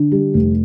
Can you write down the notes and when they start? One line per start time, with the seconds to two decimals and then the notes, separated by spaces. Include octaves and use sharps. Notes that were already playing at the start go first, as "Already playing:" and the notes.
Already playing: D3
0.12 G3
0.34 F1